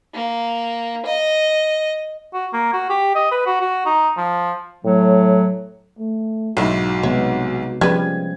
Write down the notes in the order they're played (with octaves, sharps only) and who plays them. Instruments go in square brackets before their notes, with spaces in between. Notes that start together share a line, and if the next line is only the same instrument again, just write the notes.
[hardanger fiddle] A#3
D#5
[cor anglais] F#4
A#3
F#4
G4
D#5
B4
F#4
F#4
D#4
F3
[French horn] A2 [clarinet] F#3
[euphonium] A3
[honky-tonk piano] B1 G#2 [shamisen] D#3 E3 E4 [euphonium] F#4
[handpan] C3 G#3 B3 [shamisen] C#5 E5
[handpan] F3 C#4 [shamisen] G3 G#3 B4 [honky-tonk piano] G#6